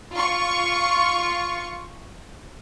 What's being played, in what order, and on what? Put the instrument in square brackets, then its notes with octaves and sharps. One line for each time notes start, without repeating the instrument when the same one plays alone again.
[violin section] F4 C#6